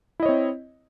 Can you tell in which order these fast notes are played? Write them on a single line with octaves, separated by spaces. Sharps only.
E4 D#5 C#5 C4